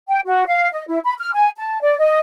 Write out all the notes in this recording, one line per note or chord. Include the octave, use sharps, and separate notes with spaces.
G5
F#4
F5
D#5
E4
B5
F6
G#5
A5
D5
D#5